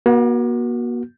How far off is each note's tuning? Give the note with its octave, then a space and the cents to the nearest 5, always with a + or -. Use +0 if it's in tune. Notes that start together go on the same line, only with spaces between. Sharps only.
A#3 +45 F#4 +0